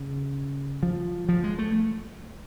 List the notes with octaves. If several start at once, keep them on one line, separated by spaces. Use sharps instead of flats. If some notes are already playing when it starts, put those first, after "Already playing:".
Already playing: C#3
F3
F3
G#3
A3